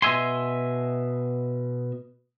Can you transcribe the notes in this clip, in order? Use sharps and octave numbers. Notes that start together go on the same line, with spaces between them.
B2 D#5 E5 G#5 C6